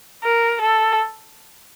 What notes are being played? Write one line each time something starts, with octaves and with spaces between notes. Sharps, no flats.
A#4
A4